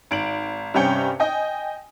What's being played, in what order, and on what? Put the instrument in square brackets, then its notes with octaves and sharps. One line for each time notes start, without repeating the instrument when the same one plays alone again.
[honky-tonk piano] G#1 D7 F#7
G2 C3 C#4 G5 C#7
D#5 G5 G#5